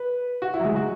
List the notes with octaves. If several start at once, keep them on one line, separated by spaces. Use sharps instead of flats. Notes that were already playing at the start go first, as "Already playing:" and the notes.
Already playing: B4
F#4
E4
F#3
G#3
F#4